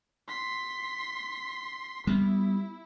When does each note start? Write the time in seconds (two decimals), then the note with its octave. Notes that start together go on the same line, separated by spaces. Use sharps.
0.28 C6 B6
2.07 G3 B3 E4